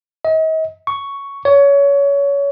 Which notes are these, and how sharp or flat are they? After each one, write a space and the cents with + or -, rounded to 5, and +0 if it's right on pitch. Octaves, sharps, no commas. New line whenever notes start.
D#5 +40
C#6 +5
C#5 +25